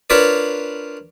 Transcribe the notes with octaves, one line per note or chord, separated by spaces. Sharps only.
D4 F4 A#4 B4 C#5 D5